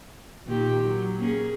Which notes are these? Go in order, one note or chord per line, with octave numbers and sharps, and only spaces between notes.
A#2 D#3 G4
F#3
A#3 C#4 G#4